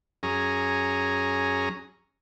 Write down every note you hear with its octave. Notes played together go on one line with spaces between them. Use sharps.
F#2 C#4 G#4 A#5